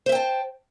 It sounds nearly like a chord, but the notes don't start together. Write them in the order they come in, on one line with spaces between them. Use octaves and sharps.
C5 E5 G5 A5